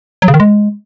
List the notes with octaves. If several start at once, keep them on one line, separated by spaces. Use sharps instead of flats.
F#3
C#3
D#3
G#3